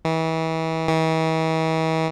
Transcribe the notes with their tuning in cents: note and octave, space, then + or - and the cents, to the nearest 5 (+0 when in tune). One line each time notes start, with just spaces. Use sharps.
E3 -35
E3 -45